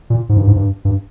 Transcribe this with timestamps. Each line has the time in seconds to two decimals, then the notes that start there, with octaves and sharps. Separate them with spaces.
0.10 A#2
0.29 G#2
0.37 G2
0.47 G#2
0.56 G2
0.85 G2